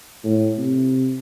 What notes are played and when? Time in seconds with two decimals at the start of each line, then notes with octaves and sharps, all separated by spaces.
0.24 A2
0.57 C3